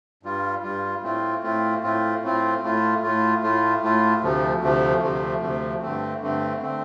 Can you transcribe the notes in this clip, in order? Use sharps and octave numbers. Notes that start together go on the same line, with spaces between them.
G2 G3 F4
G2 G3 F4
A2 A3 C4 F4
A2 A3 C4 F4
A2 A3 C4 F4
A2 A3 C4 F4
A2 A3 F4
A2 A3 F4
A2 A3 F4
A2 A3 F4
D2 C3 F3 A3
D2 C3 F3 A3
D2 C3 F3 A3
D2 C3 F3 A3
G2 D3 A3 C4
G2 D3 A3 C4
D3 A3 C4